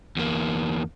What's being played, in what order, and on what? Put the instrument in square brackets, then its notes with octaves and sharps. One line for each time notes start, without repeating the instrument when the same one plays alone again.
[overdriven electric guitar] E2 A#3